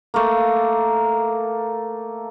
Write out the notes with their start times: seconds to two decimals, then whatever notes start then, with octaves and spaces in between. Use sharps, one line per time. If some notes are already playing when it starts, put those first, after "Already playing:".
0.14 A3 A#3